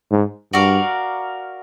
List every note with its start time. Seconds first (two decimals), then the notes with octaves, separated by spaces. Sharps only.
0.11 G#2
0.53 G2 F#4 A#4 D5 F5